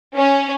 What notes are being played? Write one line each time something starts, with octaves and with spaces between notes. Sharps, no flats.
C#4